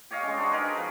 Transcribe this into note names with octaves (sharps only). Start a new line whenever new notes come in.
G4 C#5 D#5 F5
G#3 C#4
D4 F#4 C5
D#4 G#4 A#4 B4
F3 B4